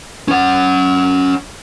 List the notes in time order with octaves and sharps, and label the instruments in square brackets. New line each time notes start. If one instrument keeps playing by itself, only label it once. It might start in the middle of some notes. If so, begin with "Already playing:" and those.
[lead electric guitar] C#4 F#5